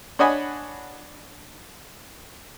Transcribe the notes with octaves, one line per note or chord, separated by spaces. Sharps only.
D4 C#5 D#5 F#5 G#5 B5